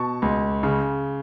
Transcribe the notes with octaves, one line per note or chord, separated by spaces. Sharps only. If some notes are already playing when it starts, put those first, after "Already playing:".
Already playing: B2 A5 C#6
C#2
C#3